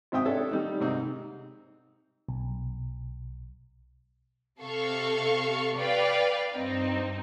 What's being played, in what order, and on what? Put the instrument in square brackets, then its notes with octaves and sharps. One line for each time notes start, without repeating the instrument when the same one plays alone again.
[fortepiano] G#1 G#2 E5 G5 D#6
D4 A4 C#5 E5
D#3 G3 D#4
G#2 C3 D#4
[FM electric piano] B1
[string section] C3 A4 F5 C#6
B4 D5 F5 G5
G2 C4 D#4